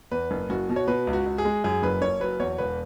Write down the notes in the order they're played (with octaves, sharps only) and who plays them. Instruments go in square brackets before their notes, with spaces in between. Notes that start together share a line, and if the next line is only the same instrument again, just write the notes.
[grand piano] E2 B4
F#1
F#1 F#4
B2
C#5
B2 B4
C#2
F#4
C#2
G#4
G#3
F#2 G#4
F#1 B4
F#1 C#5
F#3 B4
E2 C#5
E1 B4